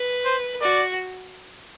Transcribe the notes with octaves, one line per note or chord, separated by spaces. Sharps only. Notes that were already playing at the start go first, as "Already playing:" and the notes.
Already playing: B4
C5
F#4 D5